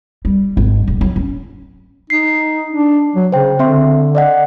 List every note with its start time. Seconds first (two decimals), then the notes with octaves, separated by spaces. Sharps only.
0.25 G3
0.57 G#1
0.88 D#1
1.01 F#3
1.16 C#4
2.10 D#4 C7
2.73 D4
3.16 F#3
3.32 C#3 C5 G5
3.59 D3 C4 E5 C6
4.15 D5 D#5 F#5